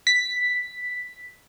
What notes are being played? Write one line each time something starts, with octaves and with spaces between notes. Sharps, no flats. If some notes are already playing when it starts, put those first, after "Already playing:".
B6